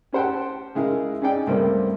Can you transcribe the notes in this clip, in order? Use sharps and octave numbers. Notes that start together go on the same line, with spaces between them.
C#4 G4 C5 F#5 G5 A5
C#3 G#3 E4 G#4 A#4
C#4 D#4 G#4 D5 G5
C#2 G2 A3 A#3 C4